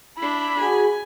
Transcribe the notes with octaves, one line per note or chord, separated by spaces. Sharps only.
D4 E4 B5
F#4 G#4 G#5